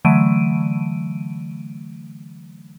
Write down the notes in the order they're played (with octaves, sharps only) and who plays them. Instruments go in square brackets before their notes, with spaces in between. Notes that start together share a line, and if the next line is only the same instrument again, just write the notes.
[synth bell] D3 E3 F#3 A3 D7 D#7